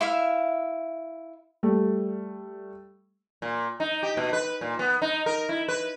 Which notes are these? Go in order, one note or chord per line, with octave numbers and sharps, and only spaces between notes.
E4 E5 F5
G3 A3
A#2
D#4
G4
B2
B4
A#2
B3
D#4
A#4
E4
B4